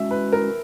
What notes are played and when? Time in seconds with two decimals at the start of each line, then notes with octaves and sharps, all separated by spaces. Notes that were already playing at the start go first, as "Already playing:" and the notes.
Already playing: G#3 C#4 F#4 E5
0.11 B4
0.33 A#4